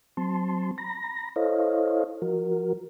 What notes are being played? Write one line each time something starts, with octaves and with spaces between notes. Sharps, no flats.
F#3 C4 A5 C6
A#5 B5 A#6
E4 A4 C5 C#5 D#5 F5
F3 F#4 A#4